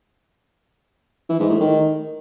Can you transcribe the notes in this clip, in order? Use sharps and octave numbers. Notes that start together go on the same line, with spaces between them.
E3
G#2
A2
D#3